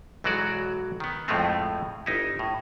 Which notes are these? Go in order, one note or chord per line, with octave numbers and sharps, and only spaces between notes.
B1 E3 F#3 G#3 F#4 D5
D#3 B3
F2 A2 F3 G#3 A3 C4
G1 D#4 E4
A2